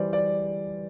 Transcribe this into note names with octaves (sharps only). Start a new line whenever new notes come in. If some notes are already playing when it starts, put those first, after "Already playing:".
Already playing: E3 G3 C5 D5
D5